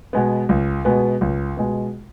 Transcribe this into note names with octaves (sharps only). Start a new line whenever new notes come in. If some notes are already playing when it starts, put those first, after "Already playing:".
B2 G#3 B3
C#2
B2 G#3 B3
C#2
B2 G#3 B3